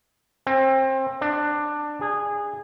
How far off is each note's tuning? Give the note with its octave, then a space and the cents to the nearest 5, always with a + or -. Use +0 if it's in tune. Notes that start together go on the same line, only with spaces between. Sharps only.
C4 +25
D4 +15
G#4 -15